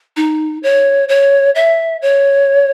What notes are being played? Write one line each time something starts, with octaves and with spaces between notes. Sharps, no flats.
D#4
C#5
C#5
E5
C#5